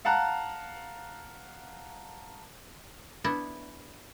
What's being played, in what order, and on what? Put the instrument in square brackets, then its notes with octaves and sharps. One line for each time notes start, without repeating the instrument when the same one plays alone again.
[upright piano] F5 F#5 A5 A#5 F#6
[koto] B3 D4 E4